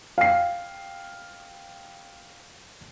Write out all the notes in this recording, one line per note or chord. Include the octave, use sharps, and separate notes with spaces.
F5 G5 C7